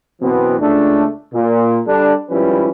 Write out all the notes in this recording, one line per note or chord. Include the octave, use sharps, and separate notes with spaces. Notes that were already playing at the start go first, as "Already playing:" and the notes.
F#2 B2 E3 B3 C4
C#2 A3 D4
A#2
G3 D4 A4
G#1 F3 G3 C#4 E4 B4